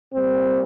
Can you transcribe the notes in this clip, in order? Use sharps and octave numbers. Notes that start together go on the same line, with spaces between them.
A#2 G3 C4